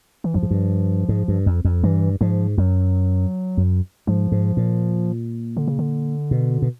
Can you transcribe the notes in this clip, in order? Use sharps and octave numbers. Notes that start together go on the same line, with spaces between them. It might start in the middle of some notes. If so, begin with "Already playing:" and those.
E3
G2 F3
G#2
G2
G#2
G2
F2
F2
G2 E3
G#2 F3
F#2 F#3
F#2
G#2 F3
G#2
A#2
D3
C#3
D3
B2
B2